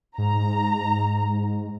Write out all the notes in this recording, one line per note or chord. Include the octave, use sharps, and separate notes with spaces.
G#2 A#5